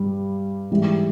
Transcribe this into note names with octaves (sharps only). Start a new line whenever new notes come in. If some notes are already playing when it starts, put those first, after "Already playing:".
Already playing: G2 G3
G#2 E3 G3